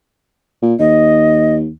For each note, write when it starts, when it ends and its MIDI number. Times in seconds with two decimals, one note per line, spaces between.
0.62 0.74 46
0.79 1.69 39
0.79 1.55 75